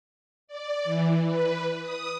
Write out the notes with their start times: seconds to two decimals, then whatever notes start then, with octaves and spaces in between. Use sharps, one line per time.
0.47 D5
0.84 E3
1.25 B4
1.81 D#6